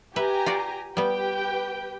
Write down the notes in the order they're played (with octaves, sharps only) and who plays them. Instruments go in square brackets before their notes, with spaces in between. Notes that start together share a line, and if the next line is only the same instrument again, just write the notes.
[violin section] G4 G#5 A#5 [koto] B4 E5
[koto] F4 F#4 D5
[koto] G3 B3 [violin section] G4 B4 G5